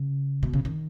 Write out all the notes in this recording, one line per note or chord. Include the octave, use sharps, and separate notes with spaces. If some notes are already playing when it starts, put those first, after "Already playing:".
Already playing: C#3
B2
C#3
D#3